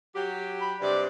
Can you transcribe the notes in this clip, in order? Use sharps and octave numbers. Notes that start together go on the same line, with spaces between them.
F#3 G4
B5
G2 C3 D5